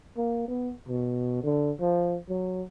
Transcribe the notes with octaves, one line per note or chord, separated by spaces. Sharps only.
A#3
B3
B2
D3
F3
F#3